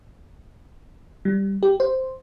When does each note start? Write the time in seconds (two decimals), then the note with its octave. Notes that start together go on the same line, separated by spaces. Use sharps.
1.25 G3
1.63 G4
1.80 C5